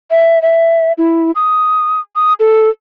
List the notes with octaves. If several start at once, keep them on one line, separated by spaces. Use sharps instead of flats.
E5
E5
E4
D#6
D#6
A4